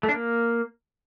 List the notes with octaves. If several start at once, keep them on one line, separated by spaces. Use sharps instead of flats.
A3
D4
A#3